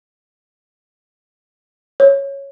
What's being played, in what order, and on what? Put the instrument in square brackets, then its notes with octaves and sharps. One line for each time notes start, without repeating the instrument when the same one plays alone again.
[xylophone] C#5